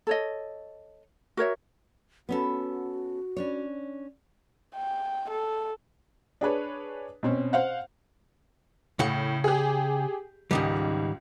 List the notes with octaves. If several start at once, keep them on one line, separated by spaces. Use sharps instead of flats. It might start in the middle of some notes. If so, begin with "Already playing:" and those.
A4 C#5 D#5
F#4 A#4 C#5 E5
B3 C#4 F#4 A4
C#4 D4 C#5
G5
A4
D4 G#4 B4 C#5
B2 C4 C#4
C5 F5 F#5
A2 C#3 F#5
G4 G#4
C#2 G#2 D#3 G3